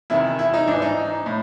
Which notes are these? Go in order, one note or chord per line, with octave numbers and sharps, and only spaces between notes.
E2 C3 D#3 E4
E4
D#4
G#2 E3 D4
D#4
A2